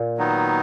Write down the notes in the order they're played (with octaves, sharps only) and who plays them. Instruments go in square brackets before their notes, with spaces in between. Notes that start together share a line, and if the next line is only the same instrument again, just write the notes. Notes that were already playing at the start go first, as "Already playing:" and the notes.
Already playing: [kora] A#2
[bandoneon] D#3 F#3 B3 D#4